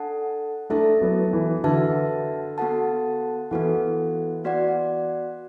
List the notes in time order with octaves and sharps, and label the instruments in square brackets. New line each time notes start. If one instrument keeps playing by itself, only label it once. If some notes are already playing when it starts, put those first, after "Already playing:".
Already playing: [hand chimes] D4 A4 F#5 A5
[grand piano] A3 D4 [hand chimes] E4 A4 E5 A5
[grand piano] F#3 B3
E3
[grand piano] D3 [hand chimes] F#4 B4 E5 A5
[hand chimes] B3 F#4 A4 F#5 A5
[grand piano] E3 [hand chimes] B3 F#4 A4 F#5
[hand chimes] B3 F#4 D5 F#5